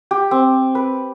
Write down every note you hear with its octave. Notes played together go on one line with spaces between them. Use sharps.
G4
C4
B4